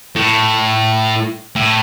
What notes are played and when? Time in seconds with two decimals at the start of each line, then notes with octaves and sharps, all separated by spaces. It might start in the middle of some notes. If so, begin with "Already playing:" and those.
0.16 A2
1.56 A2